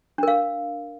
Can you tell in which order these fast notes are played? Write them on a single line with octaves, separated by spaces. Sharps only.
D4 A#4 F5